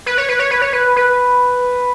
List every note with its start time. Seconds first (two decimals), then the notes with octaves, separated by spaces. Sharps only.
0.06 B4
0.18 C#5
0.29 B4
0.39 C#5
0.51 B4
0.62 C#5
0.73 B4
0.96 B4